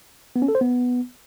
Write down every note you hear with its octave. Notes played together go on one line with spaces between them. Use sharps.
B3
C#4
A4
C5
B3